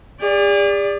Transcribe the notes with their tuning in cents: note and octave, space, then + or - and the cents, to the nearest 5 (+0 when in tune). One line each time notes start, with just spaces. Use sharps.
G#4 -45 D5 -10